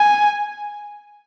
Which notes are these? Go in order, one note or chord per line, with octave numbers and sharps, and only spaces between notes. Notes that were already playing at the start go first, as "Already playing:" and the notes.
Already playing: G#5